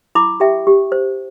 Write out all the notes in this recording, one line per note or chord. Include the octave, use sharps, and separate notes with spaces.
E4 B5 D6
G4 E5 G5
G4
C5